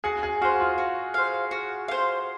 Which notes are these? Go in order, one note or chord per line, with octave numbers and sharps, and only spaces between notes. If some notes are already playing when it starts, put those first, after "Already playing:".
F#4 G#4
G#4
F#4 C5 F5
F4
F#4
C5 F5
F#4
C5 F5